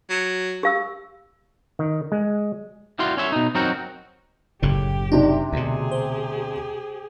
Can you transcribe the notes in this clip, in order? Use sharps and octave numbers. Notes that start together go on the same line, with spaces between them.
F#3
G4 F5 E6
D#3
G#3
G3 E4 F#4 F5 C6
C#4 C#5 E5
B2 D#4
F#3 C4 D#4 F#4 A#4
F#1 A2 C#3 G4
C3 D4 D#4
D2 B2 G4 G#4
C5